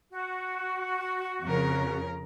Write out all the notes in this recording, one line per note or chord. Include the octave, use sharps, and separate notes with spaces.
F#4
F2 C#3 A#4